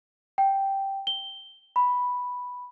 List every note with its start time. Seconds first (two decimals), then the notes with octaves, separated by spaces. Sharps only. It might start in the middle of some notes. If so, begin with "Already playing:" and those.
0.38 G5
1.07 G7
1.76 B5